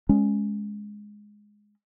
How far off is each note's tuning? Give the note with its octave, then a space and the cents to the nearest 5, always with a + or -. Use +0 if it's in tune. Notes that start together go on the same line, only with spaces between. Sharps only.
G#3 +0 C#4 +0